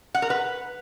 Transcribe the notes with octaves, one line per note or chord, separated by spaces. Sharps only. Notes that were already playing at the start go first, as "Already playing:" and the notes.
F#5
A#4
B4